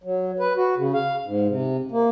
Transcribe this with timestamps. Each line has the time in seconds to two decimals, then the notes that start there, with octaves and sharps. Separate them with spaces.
0.04 F#3
0.40 B4
0.57 F#4
0.77 C#3
0.94 F5
1.26 G#2
1.49 C3
1.92 A#3